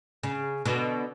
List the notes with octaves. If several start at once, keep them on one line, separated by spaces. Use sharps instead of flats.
C#3
B2 D3